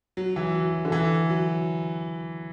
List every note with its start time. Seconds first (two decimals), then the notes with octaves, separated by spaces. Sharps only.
0.17 F#3
0.36 E3
0.55 F#3
0.85 D3
0.92 E3
1.30 F#3